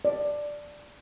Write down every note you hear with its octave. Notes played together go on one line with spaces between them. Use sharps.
D5